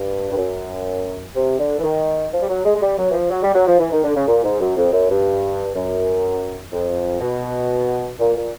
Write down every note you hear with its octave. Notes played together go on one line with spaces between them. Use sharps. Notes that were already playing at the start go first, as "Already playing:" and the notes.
Already playing: G2
G2
F#2
C3
D3
E3
D#3
F3
G3
F#3
G#3
G#3
G3
F#3
E3
F3
F#3
G3
F#3
F3
E3
D#3
D3
C#3
A#2
G#2
F#2
F2
F#2
G2
F#2
F2
B2
A#2
A#2